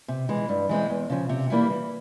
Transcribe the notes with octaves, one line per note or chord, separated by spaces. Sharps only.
C3
E3 G#3
G2
E3 G#3 C4
E2
C#3 F3
C3
E3 G3 A#3 E4
E3